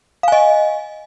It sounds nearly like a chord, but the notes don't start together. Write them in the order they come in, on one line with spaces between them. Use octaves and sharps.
F5 G#5 D#5